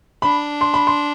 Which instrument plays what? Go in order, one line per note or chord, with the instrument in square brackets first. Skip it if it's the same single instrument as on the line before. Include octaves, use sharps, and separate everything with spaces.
[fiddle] D4 [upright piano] B5
[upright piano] C6
B5
C6